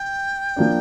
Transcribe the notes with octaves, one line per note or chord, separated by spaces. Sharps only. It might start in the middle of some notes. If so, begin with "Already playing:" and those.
Already playing: G5
F3 A#3 D4